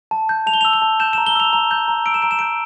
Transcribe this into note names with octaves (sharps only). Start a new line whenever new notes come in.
A5
G6
A5 F7
G7
F7
E6
F7
A5
G6 E7
E7
A#5
G7
E6 F7
A#5 F7
G6
A#5
E6 D7
E7
A#5 D7
E7
D7
G6